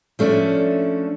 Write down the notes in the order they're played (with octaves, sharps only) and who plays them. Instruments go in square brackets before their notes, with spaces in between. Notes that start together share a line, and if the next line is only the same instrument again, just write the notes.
[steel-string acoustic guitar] F3 A3 C#4 D4